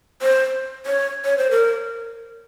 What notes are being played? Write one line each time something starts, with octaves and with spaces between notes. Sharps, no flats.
C5
C#5
C#5
C5
A#4